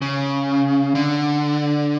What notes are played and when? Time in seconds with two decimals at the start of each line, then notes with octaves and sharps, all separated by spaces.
0.02 C#3
0.95 D3